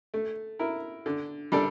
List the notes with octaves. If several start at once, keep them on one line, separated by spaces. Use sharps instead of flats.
A3
E4 A#4
D3
G3 D4 A4